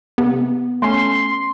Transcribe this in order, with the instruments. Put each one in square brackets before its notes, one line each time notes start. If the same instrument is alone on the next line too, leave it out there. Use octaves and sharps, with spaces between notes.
[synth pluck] C3 [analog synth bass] B3
[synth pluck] A3 C#4 [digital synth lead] C6